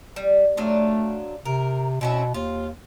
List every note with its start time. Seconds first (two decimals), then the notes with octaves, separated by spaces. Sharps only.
0.16 G3
0.57 F#3 A3 D4 F4
1.45 C3 A#4
2.01 B2 C4 C#4 E4
2.34 D#2 F4